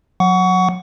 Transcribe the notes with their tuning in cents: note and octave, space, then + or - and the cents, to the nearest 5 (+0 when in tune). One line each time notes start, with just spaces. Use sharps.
F#3 -20 F#5 +0 C#6 +25